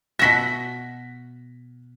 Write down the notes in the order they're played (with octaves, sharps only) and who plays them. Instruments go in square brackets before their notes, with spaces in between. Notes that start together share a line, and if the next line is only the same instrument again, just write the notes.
[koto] B2 F#4 E5 [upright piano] A#6 B6